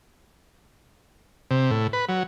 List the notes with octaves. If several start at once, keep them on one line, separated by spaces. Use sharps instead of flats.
C3
A2
B4
F#3